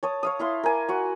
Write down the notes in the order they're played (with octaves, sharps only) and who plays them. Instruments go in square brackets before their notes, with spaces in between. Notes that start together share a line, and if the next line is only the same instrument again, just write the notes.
[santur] C#5 A5 D#6
C#5 F5 D#6
E4 F5 C6
A#4 G#5 D6
F#4 F#5